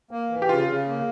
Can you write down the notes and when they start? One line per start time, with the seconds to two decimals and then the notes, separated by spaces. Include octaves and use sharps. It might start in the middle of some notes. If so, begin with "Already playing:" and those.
0.11 A#3
0.30 E3
0.42 G4
0.49 C#3 F4
0.68 C#3
0.87 A#3